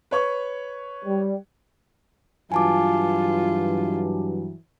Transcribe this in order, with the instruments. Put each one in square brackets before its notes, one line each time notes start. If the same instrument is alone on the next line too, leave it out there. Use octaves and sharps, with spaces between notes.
[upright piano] B4 C#5 C#6
[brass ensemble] G3
[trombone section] G2 E3 F#3 [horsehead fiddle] F4 [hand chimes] G#5 A5 D6